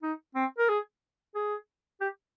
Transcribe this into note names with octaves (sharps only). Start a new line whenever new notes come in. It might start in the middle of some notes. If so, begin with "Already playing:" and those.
D#4
C4
A#4
G#4
G#4
G4